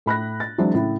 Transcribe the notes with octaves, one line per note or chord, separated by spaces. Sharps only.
A2 B5 F#6 A#6
A6
E3 F#3 G#3 C4 D4
A2 C#3 E4